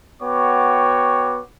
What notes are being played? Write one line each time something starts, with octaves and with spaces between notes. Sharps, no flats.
B3 F#4 C#5 G5 D6